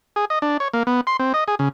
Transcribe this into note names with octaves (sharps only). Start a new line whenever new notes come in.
G#4
D#5
D4
C#5
A#3
B3
C6
C4
D#5
G#4
C#3